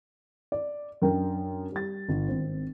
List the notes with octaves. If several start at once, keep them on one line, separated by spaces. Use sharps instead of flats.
D5
F#2 D4 A#4 G5
G3 A6
G1
G#1 C4